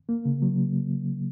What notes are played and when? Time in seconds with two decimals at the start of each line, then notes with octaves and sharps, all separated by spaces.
0.09 A#3
0.25 C#3
0.42 F#3